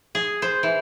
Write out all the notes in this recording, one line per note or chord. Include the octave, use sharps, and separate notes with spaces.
G#4
C5
E3